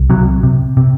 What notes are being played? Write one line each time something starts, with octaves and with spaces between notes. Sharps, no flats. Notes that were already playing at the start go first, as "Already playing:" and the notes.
Already playing: C2
C3 F#3
C3
C3